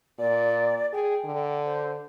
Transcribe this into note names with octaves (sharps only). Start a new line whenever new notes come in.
A#2 D5
G#4 G5
D3
C5